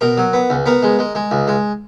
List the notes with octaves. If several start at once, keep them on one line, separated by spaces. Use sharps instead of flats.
B2 A#4
F#3
B3
C#2
B3 A#4
G#3
G#3
G#3
C#2
G#3